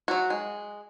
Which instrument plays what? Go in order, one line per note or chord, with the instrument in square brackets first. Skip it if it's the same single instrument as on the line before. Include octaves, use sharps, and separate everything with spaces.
[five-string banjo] F#3 F#4
G#3